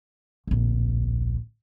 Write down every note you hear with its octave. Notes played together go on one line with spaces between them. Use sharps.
D1 A#1